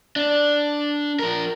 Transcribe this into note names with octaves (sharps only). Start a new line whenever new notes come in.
D4
F3 A#4